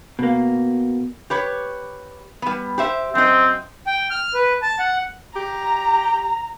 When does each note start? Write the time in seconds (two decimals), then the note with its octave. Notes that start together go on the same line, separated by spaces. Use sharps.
0.19 B2 A#3
1.30 G4 B4 C#5
2.42 G3 B3
2.78 G4 C5 E5
3.15 F#2 C4 D#5
3.87 G5
4.10 F6
4.34 B4
4.62 A5
4.79 F#5
5.36 G4 A#5